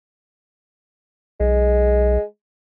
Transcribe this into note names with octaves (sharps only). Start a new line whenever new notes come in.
B1 G#3